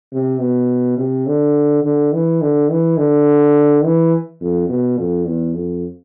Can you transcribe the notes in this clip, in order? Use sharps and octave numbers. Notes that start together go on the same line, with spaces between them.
C3
B2
C3
D3
D3
E3
D3
E3
D3
E3
F2
B2
F2
E2
F2